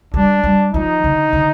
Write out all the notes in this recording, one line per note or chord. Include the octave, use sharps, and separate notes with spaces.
G3 D4
G3
F3 D#4
D3
D3